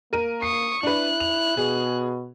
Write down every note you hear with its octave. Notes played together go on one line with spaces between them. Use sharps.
A#3 A#4 D#7
C#6 D#6 C7
D4 E4 B4 F#6
F7
B2 G#4